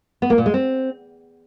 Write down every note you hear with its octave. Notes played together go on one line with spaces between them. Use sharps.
B3
A#3
A#2
G#3
C4